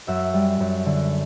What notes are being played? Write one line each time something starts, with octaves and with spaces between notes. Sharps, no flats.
F#2 E5 F#5
G3
F#2
D3